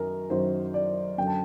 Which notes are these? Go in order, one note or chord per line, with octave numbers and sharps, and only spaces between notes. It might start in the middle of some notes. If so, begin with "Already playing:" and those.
Already playing: F#2 D#3 F#3 A#4
F#2 D#3 F#3 C5
D5
F#2 D3 F#3 G5
A5